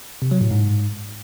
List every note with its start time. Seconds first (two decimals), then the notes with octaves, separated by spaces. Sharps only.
0.22 C3
0.31 F#3
0.41 A2
0.51 G#2